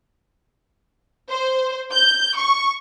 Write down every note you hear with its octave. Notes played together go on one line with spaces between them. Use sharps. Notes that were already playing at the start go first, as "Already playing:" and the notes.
C5
G6
C#6